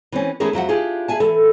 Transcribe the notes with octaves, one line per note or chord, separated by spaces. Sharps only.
E3 C4 C#4
E3 A3 C#4 E4 G#4 A#4
F2 F#3 E5 F#5
D4 E4 F4 G4 G#4
G#4 E5 G#5 A5
E3 A4